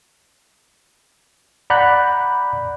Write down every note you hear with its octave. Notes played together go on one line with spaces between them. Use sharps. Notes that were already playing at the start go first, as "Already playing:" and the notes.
D5 F#5 A#5 B5 F#6 G6